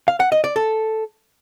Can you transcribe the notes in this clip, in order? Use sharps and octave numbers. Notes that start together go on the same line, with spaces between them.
F5
F#5
D#5
D5
A4